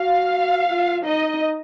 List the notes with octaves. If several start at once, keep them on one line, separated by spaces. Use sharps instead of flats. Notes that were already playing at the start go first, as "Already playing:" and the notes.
Already playing: F#4 F5
F4
D#4 D#5